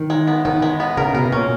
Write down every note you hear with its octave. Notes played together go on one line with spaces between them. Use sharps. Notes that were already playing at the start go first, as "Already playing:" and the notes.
Already playing: D#3
G#3
B3
D#3 B3
G#3
B3
C#3 A#4
B2 A#4
A#2 C#4